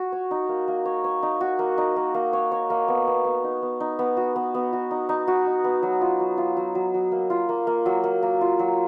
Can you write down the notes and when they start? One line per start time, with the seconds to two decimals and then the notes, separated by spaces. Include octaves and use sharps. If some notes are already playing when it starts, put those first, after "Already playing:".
Already playing: F#4
0.12 C#5
0.31 D#4
0.49 A#3
0.68 A#3
0.85 C#5
1.04 C#5
1.23 D#4
1.41 F#4
1.59 A#3
1.78 D#4
1.96 A#3
2.14 A#3
2.33 C#5
2.52 C#5
2.70 A#3
2.88 B3
3.07 B3
3.25 B3
3.44 D#4
3.62 B3
3.80 D#4
3.99 B3
4.17 F#4
4.36 B3
4.54 B3
4.73 F#4
4.91 D#4
5.09 D#4
5.28 F#4
5.47 D#4
5.64 B3
5.83 F#3
6.01 F4
6.20 F#3
6.38 F4
6.57 F#3
6.75 F#3
6.94 F#3
7.12 A#3
7.30 F4
7.49 A#3
7.67 A#3
7.86 F#3
8.04 A#3
8.22 A#3
8.41 F4
8.59 F#3